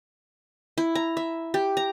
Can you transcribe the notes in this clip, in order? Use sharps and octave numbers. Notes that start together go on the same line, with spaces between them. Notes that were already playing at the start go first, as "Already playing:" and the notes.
E4
A#5
E5
G4
A#5